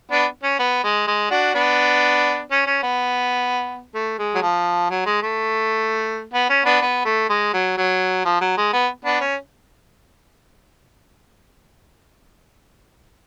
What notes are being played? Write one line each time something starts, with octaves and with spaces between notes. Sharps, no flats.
B3 D4
C#4
B3
G#3
G#3
D4 F#4
B3 D4
C#4
C#4
B3
A3
G#3
F#3
F3
F#3
G#3
A3
B3
C#4
B3 D4
B3
A3
G#3
F#3
F#3
F3
F#3
G#3
B3
B3 D4
C#4